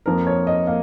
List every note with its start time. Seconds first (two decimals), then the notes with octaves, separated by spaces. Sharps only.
0.06 F2 F3 A#3 A#4
0.27 C#5
0.47 D#5
0.67 A#3 F5